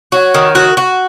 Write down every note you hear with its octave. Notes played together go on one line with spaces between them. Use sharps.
F#4 C#5
D#3
F#4
F#4